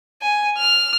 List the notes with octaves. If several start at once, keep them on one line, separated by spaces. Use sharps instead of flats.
G#5
F6